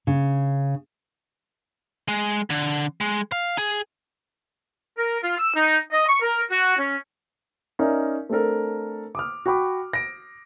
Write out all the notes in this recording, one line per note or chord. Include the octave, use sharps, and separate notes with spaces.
C#3
G#3
D3
G#3
F5
G#4
A#4
F4
E6
D#4
D#5
C#6
A#4
F#4
C#4
C#4 D#4 A#4 D5 E5
A3 C4 D4 A4 A#4
D6 D#6 F6
F#4 G5 B5 D6
A#6 D7